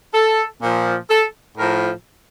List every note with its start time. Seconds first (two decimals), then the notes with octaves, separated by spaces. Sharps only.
0.14 A4
0.62 A#2 F3
1.10 A4
1.57 A2 F3 A#4